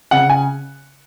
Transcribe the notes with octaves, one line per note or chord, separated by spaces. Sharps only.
C#3 F#5
G#5